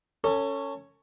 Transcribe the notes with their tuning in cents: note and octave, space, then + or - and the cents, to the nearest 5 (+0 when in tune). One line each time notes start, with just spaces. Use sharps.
C#4 +0 A4 +35